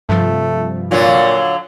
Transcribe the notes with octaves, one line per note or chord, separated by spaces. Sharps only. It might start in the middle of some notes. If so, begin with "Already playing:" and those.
G2 C3 F3 A3
A#2 D3 F#3 F4 C#5